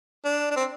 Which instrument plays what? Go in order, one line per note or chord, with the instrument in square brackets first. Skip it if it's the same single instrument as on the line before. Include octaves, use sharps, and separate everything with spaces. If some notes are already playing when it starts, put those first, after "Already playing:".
[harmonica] D4
D4
C4